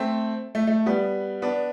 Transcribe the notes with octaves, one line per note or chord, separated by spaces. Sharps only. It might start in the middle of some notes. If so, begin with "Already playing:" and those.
Already playing: A3 C4
A3
A3
G3 B3
B3 D4